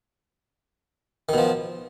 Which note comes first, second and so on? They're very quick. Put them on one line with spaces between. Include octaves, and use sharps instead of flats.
D#3 B2 F3